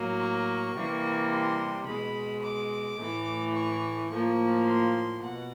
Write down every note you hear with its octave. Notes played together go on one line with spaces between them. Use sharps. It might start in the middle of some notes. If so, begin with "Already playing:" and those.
Already playing: A2 F#3 A#3
C#6
C3 E3 G3 A#3
C6
B2 G#3 B5
D6
A2 E3 A3
C#6
A2 F3 A#3 C#6
C6
B2 F#5